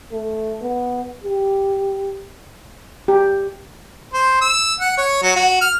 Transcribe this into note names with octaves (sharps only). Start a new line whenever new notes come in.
A3
B3
G4
G4
C5
E6
F#5
C#5
F#3
F#4
F6